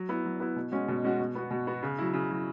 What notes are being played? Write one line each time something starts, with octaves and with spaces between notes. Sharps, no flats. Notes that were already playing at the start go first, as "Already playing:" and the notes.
Already playing: F#3
B3 E4
F#3
B3 E4
B2
G#3 C#4 F#4
B2
G#3 C#4 F#4
B2
B3 F#4
B2
B3 F#4
C#3
F#3 E4
C#3
F#3 E4